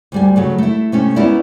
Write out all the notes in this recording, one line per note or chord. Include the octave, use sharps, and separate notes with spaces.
D2 G3 G#5
C#3 F#3 A3
A3 E4
C3 A3 C#4
B3 C#4 D#4 E4 D5